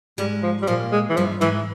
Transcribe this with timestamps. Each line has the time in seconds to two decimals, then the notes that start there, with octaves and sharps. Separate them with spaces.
0.18 G#2 G3 G#3
0.43 F3
0.62 G3
0.67 A#2 F3 A#3
0.92 G#3
1.10 E3
1.17 G2 F3 G3
1.41 G#2 E3 G#3